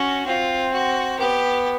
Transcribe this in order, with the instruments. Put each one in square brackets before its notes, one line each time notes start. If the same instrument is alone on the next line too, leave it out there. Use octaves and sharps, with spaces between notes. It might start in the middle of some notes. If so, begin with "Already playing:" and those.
Already playing: [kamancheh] C#4 [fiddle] F#4
[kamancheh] C4 [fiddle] F4
[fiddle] F#4
[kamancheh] B3 [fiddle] G4